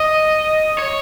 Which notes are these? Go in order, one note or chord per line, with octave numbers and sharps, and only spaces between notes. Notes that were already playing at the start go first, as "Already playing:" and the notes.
Already playing: D#5
C#5